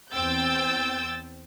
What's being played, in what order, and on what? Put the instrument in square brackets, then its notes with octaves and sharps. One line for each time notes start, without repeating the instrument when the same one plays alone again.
[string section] E2 C4 G5 E6 G6 A6